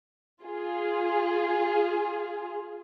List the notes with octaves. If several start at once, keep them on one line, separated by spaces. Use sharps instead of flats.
F4 G#4